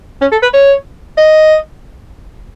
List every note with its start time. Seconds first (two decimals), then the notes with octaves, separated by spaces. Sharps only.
0.22 C#4
0.32 A4
0.43 B4
0.53 C#5
1.18 D#5